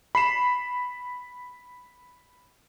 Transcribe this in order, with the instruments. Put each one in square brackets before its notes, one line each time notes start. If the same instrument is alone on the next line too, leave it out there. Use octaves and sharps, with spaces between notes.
[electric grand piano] B5 C7 E7